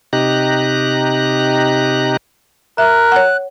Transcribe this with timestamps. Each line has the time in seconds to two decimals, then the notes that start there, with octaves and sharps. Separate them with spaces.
0.13 C3 D#4 G4 A#5 F#6
2.78 A#4 E5 F#6
3.12 C#5 F#5